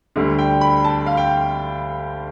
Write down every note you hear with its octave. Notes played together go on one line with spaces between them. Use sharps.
D2 D3 G3
G5
B5
A5
F5
G5